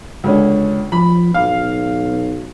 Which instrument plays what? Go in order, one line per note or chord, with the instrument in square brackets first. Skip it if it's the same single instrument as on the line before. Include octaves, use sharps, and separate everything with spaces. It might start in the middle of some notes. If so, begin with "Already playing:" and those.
[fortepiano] C#2 D3 C#4
[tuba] F3 [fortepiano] B5
[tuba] B1 [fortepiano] F5